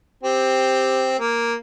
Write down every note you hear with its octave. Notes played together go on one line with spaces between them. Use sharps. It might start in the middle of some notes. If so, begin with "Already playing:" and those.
C4 G4
A#3